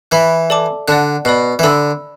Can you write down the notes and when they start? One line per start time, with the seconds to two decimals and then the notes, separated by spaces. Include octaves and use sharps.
0.11 E3 E5 B5 F#6
0.50 A4 D5 A5 D6
0.88 D3 D5 F#5 A5 F#6
1.25 B2 D5 B5 F#6
1.59 E3
1.63 D3 D5 B5 E6